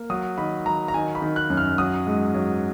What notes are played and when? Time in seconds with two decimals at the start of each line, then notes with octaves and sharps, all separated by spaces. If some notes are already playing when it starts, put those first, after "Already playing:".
Already playing: A#3
0.10 F#3 D#6
0.38 D#3 B5
0.66 F#3 A#5
0.88 A#5
0.94 D#3 G#5
1.15 B5
1.22 D#3
1.36 F#6
1.50 F#2
1.57 F6
1.78 F#3 D#6
2.07 G#2
2.34 F#3